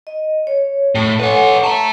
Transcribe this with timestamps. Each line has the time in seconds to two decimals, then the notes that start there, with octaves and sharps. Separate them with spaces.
0.07 D#5
0.47 C#5
0.95 A2
1.20 A4 B4 C#5 F#5 G#5
1.64 E5 A5 A#5